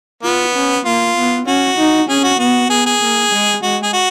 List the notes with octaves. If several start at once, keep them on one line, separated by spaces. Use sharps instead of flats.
B3 F4
C#4
A#3 F4
B3
C#4 F#4
D#4
C#4 G#4
F#4
B3 F#4
B3 G#4
G#4
A#3
G#3
G#3 F#4
G#4
F#4